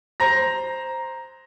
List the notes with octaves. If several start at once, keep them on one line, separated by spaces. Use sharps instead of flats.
C5 A#5 A#6